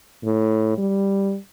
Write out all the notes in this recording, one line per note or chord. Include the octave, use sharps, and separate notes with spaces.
A2
G3